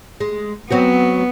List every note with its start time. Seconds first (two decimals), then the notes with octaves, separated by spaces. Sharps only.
0.20 G#3
0.70 F#3 B3 C4 F#4